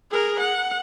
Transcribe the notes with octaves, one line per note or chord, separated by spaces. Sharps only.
G#4 A#4
F#5